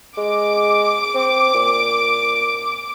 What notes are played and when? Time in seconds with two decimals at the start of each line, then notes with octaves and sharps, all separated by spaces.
0.18 G#3 D6
1.15 C4
1.54 A#2